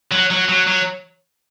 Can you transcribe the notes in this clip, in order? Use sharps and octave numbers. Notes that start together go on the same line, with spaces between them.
F#3
F#3
F#3
F#3